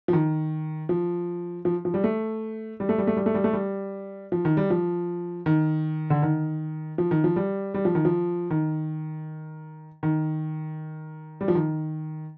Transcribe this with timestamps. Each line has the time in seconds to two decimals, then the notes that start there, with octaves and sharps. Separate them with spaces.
0.08 F3
0.13 D#3
0.89 F3
1.65 F3
1.85 F3
1.94 G3
2.04 A3
2.80 G3
2.89 A3
2.98 G3
3.07 A3
3.17 G3
3.26 A3
3.34 G3
3.44 A3
3.53 G3
4.32 F3
4.45 D#3
4.57 G3
4.70 F3
5.46 D#3
6.10 D3
6.22 D#3
6.98 F3
7.11 D#3
7.24 F3
7.36 G3
7.74 G3
7.85 F3
7.95 D#3
8.05 F3
8.50 D#3
10.03 D#3
11.41 G3
11.48 F3
11.55 D#3